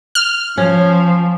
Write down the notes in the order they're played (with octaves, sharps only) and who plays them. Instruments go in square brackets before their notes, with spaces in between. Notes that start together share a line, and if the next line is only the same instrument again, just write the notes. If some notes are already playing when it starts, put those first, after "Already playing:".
[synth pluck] F6
[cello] F3 [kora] C#4